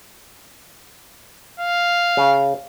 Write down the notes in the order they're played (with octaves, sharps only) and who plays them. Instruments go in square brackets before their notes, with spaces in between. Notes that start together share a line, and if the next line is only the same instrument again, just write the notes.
[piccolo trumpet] F5
[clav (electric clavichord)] C#3